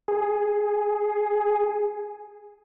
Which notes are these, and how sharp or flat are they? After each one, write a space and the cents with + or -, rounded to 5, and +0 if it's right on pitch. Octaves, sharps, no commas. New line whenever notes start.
G#4 +5